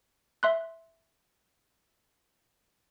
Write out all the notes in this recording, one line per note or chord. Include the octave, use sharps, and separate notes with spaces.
E5 C6 F#6